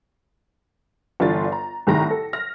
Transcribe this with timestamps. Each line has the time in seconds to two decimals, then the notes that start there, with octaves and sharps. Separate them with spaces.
1.20 G1 E3 D4 F4 A6
1.52 A#5
1.87 C2 A2 D#3 G#4 A#5 A#6
2.10 A4
2.33 F6 A#6